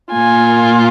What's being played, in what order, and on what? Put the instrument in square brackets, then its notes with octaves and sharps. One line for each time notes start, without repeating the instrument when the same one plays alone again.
[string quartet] A#2 A#3 F4 G#5